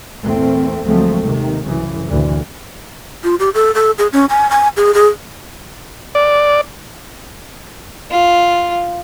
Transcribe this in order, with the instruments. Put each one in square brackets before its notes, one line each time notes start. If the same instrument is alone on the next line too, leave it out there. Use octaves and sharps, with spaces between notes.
[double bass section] E2 A#2 A3 C4
D2 F3 F#3 G#3 A3 C4
D#2 C3 D#3
C2 F#2 C#3 E3
D2 A#2 D3 E3
[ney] F4
G4
A4
A4
G#4
C#4
G#5
G#5
G#4
G#4
[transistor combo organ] D5
[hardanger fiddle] F4